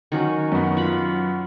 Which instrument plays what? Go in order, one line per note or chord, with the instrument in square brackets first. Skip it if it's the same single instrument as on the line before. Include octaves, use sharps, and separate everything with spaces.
[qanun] D#3 F#3 C#4
[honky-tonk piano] F#2 B3
[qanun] F4 B5